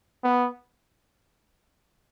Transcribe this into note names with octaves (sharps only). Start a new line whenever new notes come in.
B3